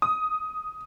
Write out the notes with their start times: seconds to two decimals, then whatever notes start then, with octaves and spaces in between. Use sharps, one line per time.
0.02 D#6